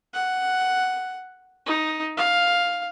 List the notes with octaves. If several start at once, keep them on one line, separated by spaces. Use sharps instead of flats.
F#5
D#4
F5